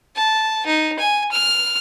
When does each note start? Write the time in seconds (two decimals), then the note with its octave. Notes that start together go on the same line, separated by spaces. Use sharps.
0.16 A5
0.66 D#4
0.99 G#5
1.32 F6